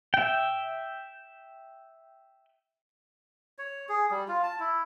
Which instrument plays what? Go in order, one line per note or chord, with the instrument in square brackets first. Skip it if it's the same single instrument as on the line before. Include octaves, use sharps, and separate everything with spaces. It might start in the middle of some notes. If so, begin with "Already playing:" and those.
[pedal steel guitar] E5 G5
[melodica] C#5
G#4
G3
F4
A5
E4